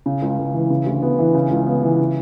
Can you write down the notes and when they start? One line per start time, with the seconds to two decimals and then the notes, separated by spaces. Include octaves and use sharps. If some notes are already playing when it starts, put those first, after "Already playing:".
0.06 C#3
0.22 C#2
0.38 C#2
0.54 E3
0.70 C#3
0.86 D2
1.02 B3
1.19 E3
1.35 C#3
1.51 C#2
1.66 B3
1.83 E3
1.99 C#3